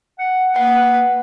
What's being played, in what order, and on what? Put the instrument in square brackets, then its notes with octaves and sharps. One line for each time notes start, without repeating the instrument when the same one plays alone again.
[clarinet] F#5
[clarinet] A#3 [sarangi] B4 [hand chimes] F#5